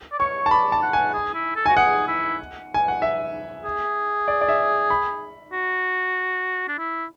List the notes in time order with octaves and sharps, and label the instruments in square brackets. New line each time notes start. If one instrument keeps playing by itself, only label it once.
[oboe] D5
[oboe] C#5 [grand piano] C#6
[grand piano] A5
[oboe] D5 [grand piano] B5
[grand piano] A5
[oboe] F#5
[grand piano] G#5
[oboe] G#4
E4
A4
[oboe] F#4 [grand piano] G#5
[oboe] G#4 [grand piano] F#5
[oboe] E4
[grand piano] G#5
F#5
E5
[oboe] G#4
[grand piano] D5
D5
E5
B5
[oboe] F#4
D4
E4